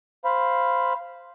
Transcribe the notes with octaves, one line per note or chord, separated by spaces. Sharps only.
C5 F5 B5